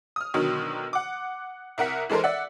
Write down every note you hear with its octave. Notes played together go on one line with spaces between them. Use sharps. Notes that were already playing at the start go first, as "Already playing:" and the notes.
D#6 F6
B2 D3 D#3 F#3
F#5 D6
C2 A#4 F#5 B6
E3 G#3 A4 A#4 C5
D5 E5 F#5